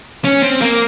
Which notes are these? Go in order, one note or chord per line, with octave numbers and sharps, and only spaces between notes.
C#4
C4
A#3